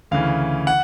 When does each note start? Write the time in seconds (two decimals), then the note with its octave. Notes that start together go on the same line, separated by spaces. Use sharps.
0.11 D2 C#3 E3 F5
0.67 F#5